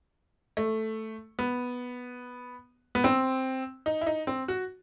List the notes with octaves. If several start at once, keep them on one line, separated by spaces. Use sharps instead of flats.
A3
B3
B3
C4
D#4
E4
D#4
C4
F#4